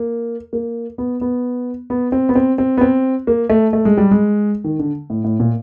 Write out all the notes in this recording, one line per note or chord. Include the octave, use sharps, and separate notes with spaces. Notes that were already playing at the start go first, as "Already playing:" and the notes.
Already playing: A#3
A#3
B3
B3
B3
C4
B3
C4
C4
B3
C4
A#3
A3
A3
G#3
G3
G#3
D#3
D3
A2
A2
A#2